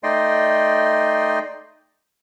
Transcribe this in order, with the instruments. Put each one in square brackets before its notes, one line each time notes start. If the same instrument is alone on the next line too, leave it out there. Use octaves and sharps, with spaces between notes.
[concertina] A3 D#4 D5 D#5 G5 C6